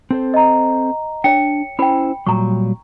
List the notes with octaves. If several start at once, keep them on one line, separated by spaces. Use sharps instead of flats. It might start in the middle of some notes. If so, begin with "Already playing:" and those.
C4 A4 C5
D#5 A#5
D4 C#5 G5 C#7
C#4 E4 C5 G5 B5
A#2 F#3 G3 A#5 C#6